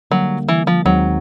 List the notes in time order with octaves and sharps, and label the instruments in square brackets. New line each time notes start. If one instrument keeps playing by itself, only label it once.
[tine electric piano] D3 G3 A#3 [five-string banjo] F#3
[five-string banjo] E3
F3
[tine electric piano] D#2 D#3 G#3 C4 D#4 [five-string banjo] F#3